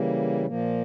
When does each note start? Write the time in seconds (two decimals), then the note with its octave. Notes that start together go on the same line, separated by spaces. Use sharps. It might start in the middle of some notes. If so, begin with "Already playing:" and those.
Already playing: C#3 E3 G3 A#3
0.46 A#2 F3 A#3